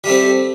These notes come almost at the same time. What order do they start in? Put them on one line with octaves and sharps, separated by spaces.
G3 A3 C4